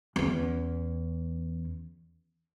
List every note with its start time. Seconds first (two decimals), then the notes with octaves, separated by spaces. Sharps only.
0.16 E2 C#4